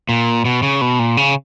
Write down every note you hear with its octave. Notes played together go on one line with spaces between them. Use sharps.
A#2
B2
C#3
B2
A#2
C#3